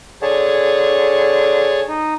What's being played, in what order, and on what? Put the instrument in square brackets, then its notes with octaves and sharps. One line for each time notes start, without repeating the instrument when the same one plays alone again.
[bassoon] D3 [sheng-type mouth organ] G#4 C#5 A5
[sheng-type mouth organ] D#4